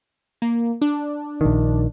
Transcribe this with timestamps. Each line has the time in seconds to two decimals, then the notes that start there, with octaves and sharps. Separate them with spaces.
0.42 A#3
0.82 D4
1.41 A#1 D#3